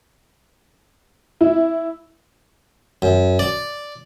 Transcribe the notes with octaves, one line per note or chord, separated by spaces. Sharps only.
E4
F#2
D5